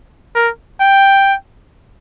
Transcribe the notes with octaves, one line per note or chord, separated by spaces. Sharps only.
A#4
G5